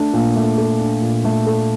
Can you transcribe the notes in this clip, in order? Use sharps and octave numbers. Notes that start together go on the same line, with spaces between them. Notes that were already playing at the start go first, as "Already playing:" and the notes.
Already playing: A3 D4 A4
A#2
A3
A4
D4
A#2
A3
A4